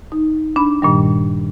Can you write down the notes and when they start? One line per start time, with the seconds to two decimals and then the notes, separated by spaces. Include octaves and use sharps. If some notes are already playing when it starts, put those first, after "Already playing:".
0.12 D#4
0.56 D4 B5
0.82 G2 A#2 D#3 G3